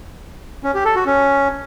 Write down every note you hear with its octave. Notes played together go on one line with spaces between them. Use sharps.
C#4
G4
A4
F#4
C#4